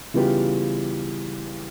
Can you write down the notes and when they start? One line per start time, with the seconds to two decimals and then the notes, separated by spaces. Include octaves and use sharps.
0.14 C#3 E3 G3 B3 F4 G4